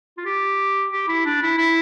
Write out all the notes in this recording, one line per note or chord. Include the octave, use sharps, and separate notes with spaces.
F4
G4
G4
E4
D4
E4
E4